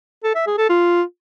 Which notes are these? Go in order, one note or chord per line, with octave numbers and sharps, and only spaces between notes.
A4
E5
G#4
A4
F4